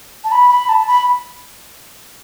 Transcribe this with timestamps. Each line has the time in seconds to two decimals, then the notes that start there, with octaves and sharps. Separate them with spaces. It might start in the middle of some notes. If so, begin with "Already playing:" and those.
0.24 A5
0.32 B5
0.50 B5
0.69 A5
0.87 B5